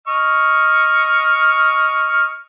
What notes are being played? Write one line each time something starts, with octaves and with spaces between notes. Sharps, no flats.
D#5 C#6 F6